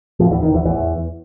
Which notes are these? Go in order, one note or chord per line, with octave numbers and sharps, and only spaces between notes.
F2 A2 F3
E2 E3
D#3
E2 E3
E2 A2 E3